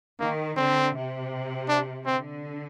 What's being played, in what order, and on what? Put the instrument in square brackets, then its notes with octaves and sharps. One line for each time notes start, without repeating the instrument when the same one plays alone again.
[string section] D#3 [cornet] A#3
[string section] D3 [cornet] C4
[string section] C3
[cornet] D4
[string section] D3 [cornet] C4